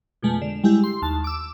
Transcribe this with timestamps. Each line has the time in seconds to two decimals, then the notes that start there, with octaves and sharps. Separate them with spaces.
0.22 F2 B2 G#3 A3
0.42 D3
0.64 G3 G#3 E4 G4
0.84 C6
1.02 D#2 A5
1.24 D6 E6